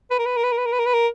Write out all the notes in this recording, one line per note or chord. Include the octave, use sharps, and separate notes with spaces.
B4
A#4
B4
A#4
B4
A#4
B4
A#4
B4
A#4
B4
A#4